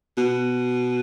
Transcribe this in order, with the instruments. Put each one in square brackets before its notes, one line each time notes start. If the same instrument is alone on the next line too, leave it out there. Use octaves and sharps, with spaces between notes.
[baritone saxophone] B2